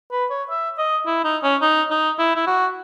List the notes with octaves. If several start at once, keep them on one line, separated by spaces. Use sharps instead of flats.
B4
C#5
E5
D#5
E4
D#4
C#4
D#4
D#4
E4
E4
F#4